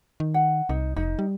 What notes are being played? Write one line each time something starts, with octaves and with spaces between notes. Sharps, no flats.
D#3
F#5
C2 D#4
F1 D#4
G3